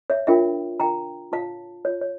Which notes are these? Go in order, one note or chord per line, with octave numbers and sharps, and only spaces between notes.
C#5 E5
D4 F4 A#4 E5 G5
D4 F4 A#4 G5 A#5
F4 C#5 F5 A5
F4 C#5
C#5